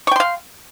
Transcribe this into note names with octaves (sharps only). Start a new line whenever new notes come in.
F5 G5 C6 C#6